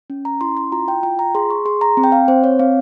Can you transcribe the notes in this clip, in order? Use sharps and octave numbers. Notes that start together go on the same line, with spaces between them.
C#4
A#5
E4 C6
C6
F4 A#5
G5
F4 G5
A#5
G#4 C6
C#6
G#4 C6
A#5
C4
G5
F5
C4 C5
C#5
C4 F5